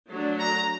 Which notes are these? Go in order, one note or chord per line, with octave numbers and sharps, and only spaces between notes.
F#3 A3 D4
A#5